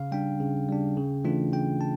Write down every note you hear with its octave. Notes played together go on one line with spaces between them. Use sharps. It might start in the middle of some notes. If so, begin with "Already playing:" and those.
Already playing: C#3 F5
G3 D4 G5
C#3
G3 D4
C#3
E3 A3 D4 F4
C#3 G5
A5